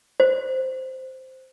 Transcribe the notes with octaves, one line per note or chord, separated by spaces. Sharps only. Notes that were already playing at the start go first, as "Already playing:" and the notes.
C5